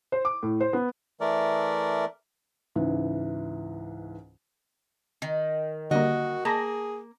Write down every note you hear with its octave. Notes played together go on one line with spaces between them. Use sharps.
C5
D6
A2
C5
B3
E3 A3 A#4 D5
C#2 G#2 E3
D#3
D3 G3 A#3 F#4 D#5
A#3 G#4 A5 A#5 A#6